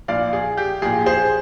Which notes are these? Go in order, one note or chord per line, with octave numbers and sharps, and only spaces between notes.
A#1 A#2 D5 F5
G#4
G4
A#1 A#2 G#4
G#4 C5